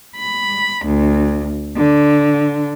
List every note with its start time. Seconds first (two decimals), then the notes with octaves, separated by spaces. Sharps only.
0.17 B5
0.86 D2
1.76 D3